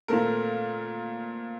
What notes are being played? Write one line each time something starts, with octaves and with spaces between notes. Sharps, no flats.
A#2 A3 C4 A#4